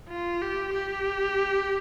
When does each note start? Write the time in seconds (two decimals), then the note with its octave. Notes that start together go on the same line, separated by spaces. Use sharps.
0.09 F4
0.42 G4
0.74 G4